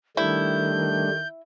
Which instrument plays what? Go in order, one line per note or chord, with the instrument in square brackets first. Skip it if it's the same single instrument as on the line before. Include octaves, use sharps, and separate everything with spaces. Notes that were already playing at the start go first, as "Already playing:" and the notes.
[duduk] D#3 [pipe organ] G3 A3 D4 [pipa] E4 [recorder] G6